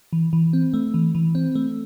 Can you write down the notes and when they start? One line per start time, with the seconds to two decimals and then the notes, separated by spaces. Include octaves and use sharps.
0.13 E3
0.33 E3
0.53 C4
0.74 A3
0.94 E3
1.15 E3
1.35 C4
1.55 A3